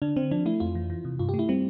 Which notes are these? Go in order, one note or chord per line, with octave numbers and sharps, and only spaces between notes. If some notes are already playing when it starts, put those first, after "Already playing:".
D3 D4
D3 C4
F3 D4
A3 E4
F2 F4
E3
E3
C3
G2 F4
G4
A3
E4
G3 C4